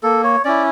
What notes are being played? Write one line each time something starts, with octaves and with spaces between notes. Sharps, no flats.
A#3 A4
C#5
C#4 E4 D5